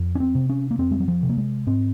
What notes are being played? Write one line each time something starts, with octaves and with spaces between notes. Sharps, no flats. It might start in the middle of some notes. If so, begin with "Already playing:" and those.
Already playing: F2
C#4
C4
C3
C#4
A#3
F2 C4
G#3
F#3
F3
C3
A#3
G#3
G#2 C4